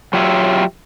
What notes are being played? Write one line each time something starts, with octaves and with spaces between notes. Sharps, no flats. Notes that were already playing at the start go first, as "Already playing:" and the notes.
F#3 F4 G4 C#5 E5